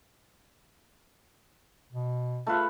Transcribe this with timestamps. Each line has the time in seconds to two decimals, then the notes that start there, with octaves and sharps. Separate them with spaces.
1.93 B2
2.47 A3 F4 B4